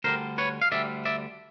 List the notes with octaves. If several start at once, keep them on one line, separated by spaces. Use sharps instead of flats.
D2 D3 G3 A#4 C5
B4 C#5
F5
D2 D3 G3 D5 E5
D5 E5